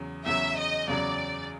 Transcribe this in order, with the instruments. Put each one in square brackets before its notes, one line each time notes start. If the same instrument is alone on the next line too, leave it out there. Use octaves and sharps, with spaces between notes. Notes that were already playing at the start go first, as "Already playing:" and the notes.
Already playing: [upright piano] E2 C#3 F#3
[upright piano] E2 C#3 F#3 [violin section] E5
[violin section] D#5
[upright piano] E2 C#3 F#3 [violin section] D5